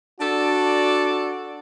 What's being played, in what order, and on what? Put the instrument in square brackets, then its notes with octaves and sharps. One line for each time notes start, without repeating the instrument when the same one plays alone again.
[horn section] D4 F#4 A4 D5